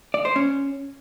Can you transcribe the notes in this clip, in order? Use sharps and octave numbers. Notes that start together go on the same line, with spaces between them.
D5
C5
C#4